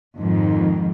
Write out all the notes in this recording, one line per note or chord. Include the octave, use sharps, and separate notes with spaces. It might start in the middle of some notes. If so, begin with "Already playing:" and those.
F2 G#2 D#3